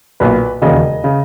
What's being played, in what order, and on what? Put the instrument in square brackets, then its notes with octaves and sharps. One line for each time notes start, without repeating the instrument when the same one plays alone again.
[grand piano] B1 A#2 B4
E1 D#2 C#3 D#5
C#3